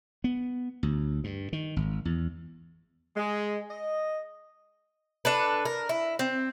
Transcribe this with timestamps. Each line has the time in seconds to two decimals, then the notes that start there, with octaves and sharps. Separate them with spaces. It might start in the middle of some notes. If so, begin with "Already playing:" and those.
0.24 B3
0.83 D2
1.24 G2
1.53 D#3
1.76 G#1
2.05 E2
3.16 G#3
3.70 D#5
5.25 D4 A4 B4
5.65 A#4
5.89 E4
6.19 C4